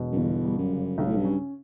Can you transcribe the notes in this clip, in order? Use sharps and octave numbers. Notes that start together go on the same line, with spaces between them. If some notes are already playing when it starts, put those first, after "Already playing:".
Already playing: E1 B2
F#2
G1 E2
G3
F#2
C#3
B1 G2
A2
G2
C#4